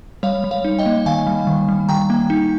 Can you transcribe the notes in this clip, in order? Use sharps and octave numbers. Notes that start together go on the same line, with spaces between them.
G3 C#5 F5
G3
C#5 F5
D#4
D#5 G5
A#3
D#3 F5 G#5
G3
D#3
G3
D#3 G5 A#5
A#3
D#4